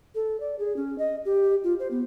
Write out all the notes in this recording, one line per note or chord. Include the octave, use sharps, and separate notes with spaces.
A4
D5
G#4
C#4
D#5
G4
F4
C5
B3